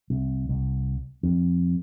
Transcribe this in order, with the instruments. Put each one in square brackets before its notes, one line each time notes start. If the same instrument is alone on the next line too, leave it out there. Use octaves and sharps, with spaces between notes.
[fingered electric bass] C2
C2
F2